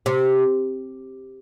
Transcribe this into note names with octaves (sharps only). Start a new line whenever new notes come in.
C3